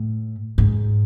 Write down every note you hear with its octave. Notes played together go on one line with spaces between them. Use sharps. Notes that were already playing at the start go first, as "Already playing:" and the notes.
Already playing: A2
G#2